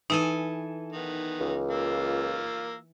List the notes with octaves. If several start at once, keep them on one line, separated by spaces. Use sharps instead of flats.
E3 D#4 A4 B4 G#5
D#3 B3
C#2
A#3 F4 E6